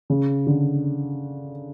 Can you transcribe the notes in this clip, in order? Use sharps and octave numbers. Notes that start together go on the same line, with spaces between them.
C#3
D3